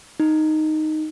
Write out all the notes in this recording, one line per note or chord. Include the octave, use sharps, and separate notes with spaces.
D#4